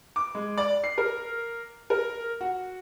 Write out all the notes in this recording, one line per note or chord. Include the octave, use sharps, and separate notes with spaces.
D6
G#3
D5
C7
A#4
A#4
F#4